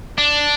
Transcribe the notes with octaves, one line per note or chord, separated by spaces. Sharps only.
D4